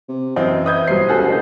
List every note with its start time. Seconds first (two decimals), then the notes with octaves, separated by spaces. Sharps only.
0.08 C3
0.36 F#2 E3 C4 D#5
0.66 B4 D#5 E5 D#6 G6 G#6
0.88 B1 G3 C5 C7
1.09 C#2 F#4 G#4 A4
1.28 C#2 D3 A#4 D#5 G6